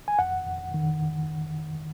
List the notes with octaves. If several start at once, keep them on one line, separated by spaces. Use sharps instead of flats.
G#5
F2 F#5
F2
D#3